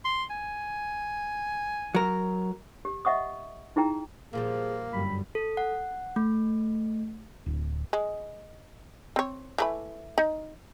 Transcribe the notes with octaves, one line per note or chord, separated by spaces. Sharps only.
C6
G#5
F#3 A#4
G4
D#5 E5 F#5 C#6 D#6
D#4 E4 G#4 G5 A#5
A#2 F3 G3 A#3 G#4
G1 F#2 G3 B5
A4
F#5
A3
D1
G#3
C4 C#5
E3 A3 B5
D#4